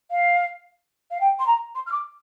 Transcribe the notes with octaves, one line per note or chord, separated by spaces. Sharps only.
F5
F5
G5
C6
A#5
C6
F6
D6